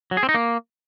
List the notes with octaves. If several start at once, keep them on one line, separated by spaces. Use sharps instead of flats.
F#3
G#4
C4
D#4
A#3